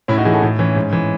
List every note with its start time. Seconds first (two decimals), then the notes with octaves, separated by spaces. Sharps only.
0.08 A2 C#4 E4
0.17 D#4 F#4
0.25 E3 E4 G#4
0.33 F#4 A4
0.42 A2 D#4
0.59 E3 C#4
0.76 G#2
0.93 E3